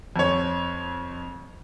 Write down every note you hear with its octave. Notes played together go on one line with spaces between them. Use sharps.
F2 C#5